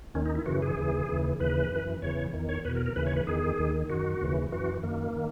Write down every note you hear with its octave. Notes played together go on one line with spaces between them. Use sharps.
D#2 D#3 C#4
D#4
E4
F#2 C#3 E3 F#4
G#4
D#2 C#3 E3
D#2 C#3 E3
D#2 C#3 E3 B4
F#2 E3
E2 C#3 E3 C#5
E2 D#3
C#5
E2 B2 B4
A#4
A#4
D#2 C#3 E3 B4
C#5
B4
E2 D#3 G#4
D#2 D#3
F#2 D#3 F#4
D#2 C#3 E3
F#2 E3 F#4
F#2 D#3 A#3
D#3